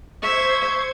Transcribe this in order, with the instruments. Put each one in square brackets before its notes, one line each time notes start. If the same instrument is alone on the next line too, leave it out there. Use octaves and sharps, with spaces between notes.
[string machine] C5 G#6 [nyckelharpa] E5 [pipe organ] C#6